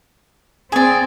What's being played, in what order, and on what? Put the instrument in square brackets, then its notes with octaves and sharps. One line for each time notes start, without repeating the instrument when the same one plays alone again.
[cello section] C4 [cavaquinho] G#4 D5